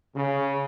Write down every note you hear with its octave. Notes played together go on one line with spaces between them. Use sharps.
C#3